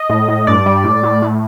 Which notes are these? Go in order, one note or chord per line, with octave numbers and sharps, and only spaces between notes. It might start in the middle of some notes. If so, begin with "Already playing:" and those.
Already playing: D#5
A2
A2
G2 D5
G3
A2
A2
A2